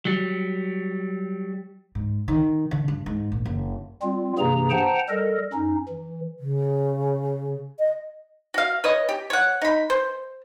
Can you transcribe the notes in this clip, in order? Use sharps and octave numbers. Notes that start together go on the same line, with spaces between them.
F#3 G3
G#2
D#3
D3
G2
G#2
A#1
F#1
G3 C4 F4
G2 C3 E3 A#3 G#4 A#5
C5 F#5 G5 A5 A#5
G3 A4 A#4 D#5
F#2 C#4 D#4
E3
C#3
D#5
F#4 F5
B4 C#5 D#5
G4
C#5 F#5
D#4 B5
C5